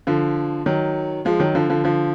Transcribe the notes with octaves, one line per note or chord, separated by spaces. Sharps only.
D3 F3
D#3 F#3
F3 G#3
D#3 F#3
D3 F3
D3 F3
D3 F3